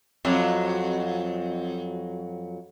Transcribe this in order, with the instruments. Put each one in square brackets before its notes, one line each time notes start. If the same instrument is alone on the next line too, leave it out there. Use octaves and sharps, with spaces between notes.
[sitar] F2 F#3